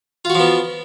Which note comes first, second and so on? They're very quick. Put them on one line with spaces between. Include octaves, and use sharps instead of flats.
F4 F#4 F3 B3